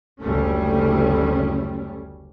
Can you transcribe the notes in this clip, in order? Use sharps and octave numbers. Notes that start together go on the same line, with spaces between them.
F#1 D2 G3 A3 C#4